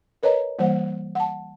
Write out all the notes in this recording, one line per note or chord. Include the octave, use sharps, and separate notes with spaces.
A#4 B4 C#5 D#5 A#5
E3 G3 A#3 C5 F#5
F#5 A5